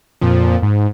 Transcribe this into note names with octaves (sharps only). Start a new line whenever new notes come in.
F2 A#2 F3
G#2